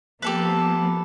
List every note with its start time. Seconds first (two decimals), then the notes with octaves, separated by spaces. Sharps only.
0.22 F3 A#3 B3 G4 A4 B4